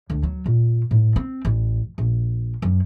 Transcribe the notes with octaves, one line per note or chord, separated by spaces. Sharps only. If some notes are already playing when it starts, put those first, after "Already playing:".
D2
F#3
A#2
A2
C4
A1
A#1
F#2